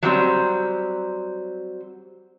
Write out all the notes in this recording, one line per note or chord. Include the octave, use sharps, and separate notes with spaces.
F#3 G3 C4